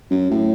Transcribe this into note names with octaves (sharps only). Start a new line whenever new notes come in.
F#2
A2